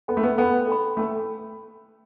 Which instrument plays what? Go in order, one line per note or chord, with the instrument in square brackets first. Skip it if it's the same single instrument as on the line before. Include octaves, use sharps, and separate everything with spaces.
[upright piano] B3 [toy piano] A4 G5 B5
[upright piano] A3
B3
[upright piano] B3 [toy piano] A4 G5 B5
[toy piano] A4 G5 B5
[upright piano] A3 [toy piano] A4 G5 B5